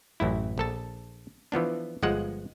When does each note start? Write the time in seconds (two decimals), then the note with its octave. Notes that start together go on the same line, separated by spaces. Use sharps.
0.20 A1 F#2 E4
0.58 A#1 A4 A5
1.52 E3 F3 B3 D4
2.03 G1 F3 G#3 F#5